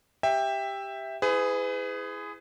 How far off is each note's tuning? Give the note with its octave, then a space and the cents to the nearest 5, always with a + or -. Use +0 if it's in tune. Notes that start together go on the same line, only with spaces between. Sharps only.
G4 +0 E5 +0 G5 +15
E4 +0 G#4 +0 B4 +40